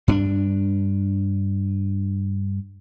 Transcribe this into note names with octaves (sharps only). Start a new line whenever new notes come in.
G2 C4 D4